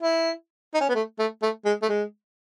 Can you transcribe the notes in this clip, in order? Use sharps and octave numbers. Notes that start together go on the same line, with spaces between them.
E4
D#4
C#4
B3
A3
A3
A3
G#3
A3
G#3